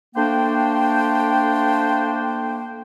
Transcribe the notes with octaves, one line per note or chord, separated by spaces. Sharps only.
A3 A#3 D4 C5 G5